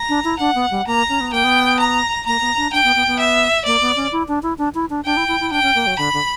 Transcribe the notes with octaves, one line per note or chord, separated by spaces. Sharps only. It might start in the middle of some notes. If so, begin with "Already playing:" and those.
Already playing: A#5
D4
E4
D4 F#5
B3
G3
A#3 A#5
C#4
B3
A#3 G5
B3
A#5
A#3 A#5
B3
D4
D4 G5
B3
B3
B3
E5
A#3 D5
B3
C#4
E4
D4
E4
D4
E4
D4
D4 G5
E4
E4
E4
D4 G5
C#4
A#3
F#3
D3 B5
D3